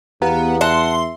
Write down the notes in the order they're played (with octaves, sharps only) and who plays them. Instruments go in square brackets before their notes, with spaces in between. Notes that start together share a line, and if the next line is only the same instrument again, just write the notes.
[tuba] E2 [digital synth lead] B3 [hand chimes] G4 F5 A#5
[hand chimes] E5 [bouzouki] F#5 A5 [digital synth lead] C6